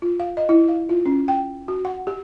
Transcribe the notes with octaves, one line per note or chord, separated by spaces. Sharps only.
F4
F5
D#5
E4
F5
F4
C#4
G5
F#4
F#5
G4